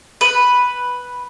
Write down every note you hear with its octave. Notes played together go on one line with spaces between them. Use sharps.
B4